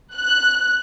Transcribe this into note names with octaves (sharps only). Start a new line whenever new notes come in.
F#6